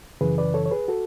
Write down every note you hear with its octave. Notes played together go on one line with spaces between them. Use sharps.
F#2 C#3 E3 G#4 B4
B4 D5
A4 C#5
C#5
G#4 B4
F#4 A4